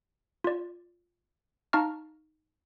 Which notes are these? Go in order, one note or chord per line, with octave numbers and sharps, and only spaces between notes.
F4 D5
D#4 F5 A5 A#5 C#6 F6